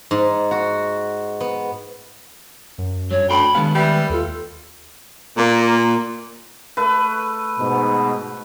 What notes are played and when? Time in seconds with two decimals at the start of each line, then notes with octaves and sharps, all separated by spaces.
0.11 G#2
0.51 F#4
1.41 B3
2.78 F#2
3.11 G2 F#3 C#5
3.30 D2 G5 B5
3.54 G2 D#3 G#3 B3 F5
3.75 G3 B4 E5 G5 B5
4.09 D#2 F4 A4
5.37 A#2 A#3
6.77 A3 B4
7.60 G#2 B2